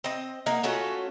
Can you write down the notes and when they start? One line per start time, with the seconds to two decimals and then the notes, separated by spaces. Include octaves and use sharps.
0.04 C4 D#5
0.46 A#3 D#4 D#5 F#5
0.63 A3 C#4 F4 F#4